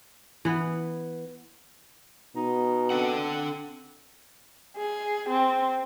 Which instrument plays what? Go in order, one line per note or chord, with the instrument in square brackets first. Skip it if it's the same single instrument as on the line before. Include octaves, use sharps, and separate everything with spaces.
[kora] E3 B3
[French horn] B2 [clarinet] D#4
[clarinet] C4 [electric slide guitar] D4 A4 F#5
[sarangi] G#4
C4